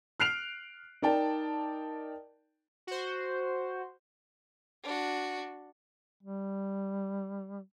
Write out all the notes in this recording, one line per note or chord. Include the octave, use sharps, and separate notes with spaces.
F6 F#6 C7 D7 F7
D#4 A#4 D5 G5 A5
F#4 C5
D4 F#4
G3